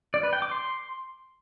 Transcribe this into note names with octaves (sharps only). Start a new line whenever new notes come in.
D5
B4
G5
D6
C6